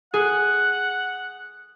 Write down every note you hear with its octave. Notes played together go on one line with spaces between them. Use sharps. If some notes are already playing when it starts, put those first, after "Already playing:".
G#4 F#5